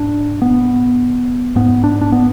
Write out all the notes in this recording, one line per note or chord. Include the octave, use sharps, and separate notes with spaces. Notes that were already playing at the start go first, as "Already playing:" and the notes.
Already playing: G#2 D4
B3
G#2 B3
D4
D4
B3